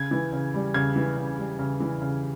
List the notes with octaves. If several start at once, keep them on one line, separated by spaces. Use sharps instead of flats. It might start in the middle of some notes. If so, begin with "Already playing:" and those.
Already playing: C#3 G#6
E3
C#3
G3
C#3 G#6
E3
C#3
G3
C#3
E3
C#3